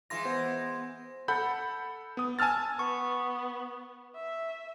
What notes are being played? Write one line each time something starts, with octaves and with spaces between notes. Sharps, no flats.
E3 G#3 F4 C6 A#6
B3 C5
A4 F#5 B5 G6
B3 D#6
G#5 A5 E6 F6 A6
B3 C#6
E5